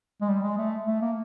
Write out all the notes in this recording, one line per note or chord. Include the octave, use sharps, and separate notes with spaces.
G#3
G3
G#3
A3
A3
A#3